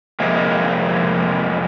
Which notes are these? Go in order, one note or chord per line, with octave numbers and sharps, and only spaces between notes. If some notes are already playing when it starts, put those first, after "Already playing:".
F2 C3 G#3 A#3